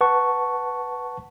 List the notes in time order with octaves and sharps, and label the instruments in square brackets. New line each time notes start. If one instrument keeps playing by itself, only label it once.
[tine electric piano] B4 F#5 A5 C#6